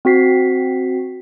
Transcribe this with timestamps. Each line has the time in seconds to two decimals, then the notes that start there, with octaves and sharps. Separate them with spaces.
0.05 C4 F#4 B6 C7